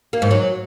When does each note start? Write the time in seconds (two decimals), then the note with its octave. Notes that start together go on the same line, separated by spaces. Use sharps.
0.13 A#3
0.22 G#2
0.31 F#3